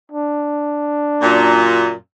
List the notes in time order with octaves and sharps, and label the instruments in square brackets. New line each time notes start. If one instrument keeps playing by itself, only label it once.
[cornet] D4
[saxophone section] F#2 A#2